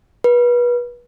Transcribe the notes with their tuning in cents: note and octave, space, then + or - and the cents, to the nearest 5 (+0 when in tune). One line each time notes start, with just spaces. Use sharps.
B4 -30